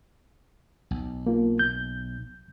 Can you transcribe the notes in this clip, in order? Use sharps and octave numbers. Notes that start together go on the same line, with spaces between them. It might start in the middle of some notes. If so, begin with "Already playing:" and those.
B1
A#3 F4
G6